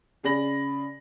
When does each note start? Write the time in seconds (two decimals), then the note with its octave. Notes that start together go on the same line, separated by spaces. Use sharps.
0.24 C#3 G#4 D5 B5 A#6 F#7